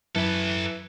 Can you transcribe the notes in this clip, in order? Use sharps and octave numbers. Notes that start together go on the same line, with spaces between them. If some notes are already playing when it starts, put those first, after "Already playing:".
F#2 E3 A4 B4